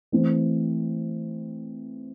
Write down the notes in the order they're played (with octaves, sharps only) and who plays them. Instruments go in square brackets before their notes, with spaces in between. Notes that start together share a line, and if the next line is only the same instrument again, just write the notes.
[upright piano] E3 A3 C4